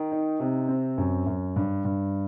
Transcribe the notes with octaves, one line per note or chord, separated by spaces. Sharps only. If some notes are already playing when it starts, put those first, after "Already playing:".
Already playing: D#3
D#4
C3
C4
F#2
F#2
G2
G2